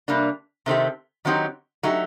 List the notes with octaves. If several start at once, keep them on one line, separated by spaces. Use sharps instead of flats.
C3 G3 A#3 D4
C3 D#3 A3 C4 G4
D#3 F#3 C4 D#4 G4
F#3 A3 D#4 G4